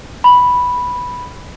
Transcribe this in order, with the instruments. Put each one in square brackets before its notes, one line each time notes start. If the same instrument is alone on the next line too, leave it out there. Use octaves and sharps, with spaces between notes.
[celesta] B5